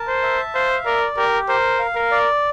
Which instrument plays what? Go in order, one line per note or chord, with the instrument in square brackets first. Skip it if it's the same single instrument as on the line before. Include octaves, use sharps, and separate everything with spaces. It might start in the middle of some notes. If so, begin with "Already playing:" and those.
Already playing: [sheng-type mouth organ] A#4 A5
[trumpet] C5
[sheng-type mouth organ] E5
[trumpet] C5 [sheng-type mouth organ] F5
[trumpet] A#4 [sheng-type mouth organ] D5
[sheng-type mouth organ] G4 [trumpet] A#4
[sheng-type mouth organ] A#4 [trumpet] C5
[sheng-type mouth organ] F5
[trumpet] A#4
[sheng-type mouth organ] D5